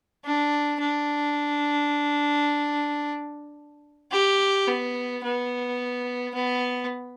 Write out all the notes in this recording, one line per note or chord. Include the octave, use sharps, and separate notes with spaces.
D4
D4
G4
B3
B3
B3